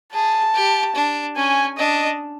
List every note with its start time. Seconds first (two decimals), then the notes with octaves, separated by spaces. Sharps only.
0.13 G#4 A5
0.54 G4
0.95 D4
1.36 C#4 G#5
1.78 D4 D#5